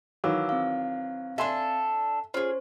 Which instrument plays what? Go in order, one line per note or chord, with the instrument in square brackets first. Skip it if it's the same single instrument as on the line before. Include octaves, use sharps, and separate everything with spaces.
[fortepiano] D#3 E3 F#3 [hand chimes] F5 D6 E6
[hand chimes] C4 F5
[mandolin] D4 A4 [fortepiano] E5 G#5 C6
[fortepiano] C#4 [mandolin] F4 G#4 [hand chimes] C5